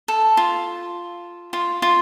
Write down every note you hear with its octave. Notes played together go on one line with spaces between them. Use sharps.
A4
F4
F4
F4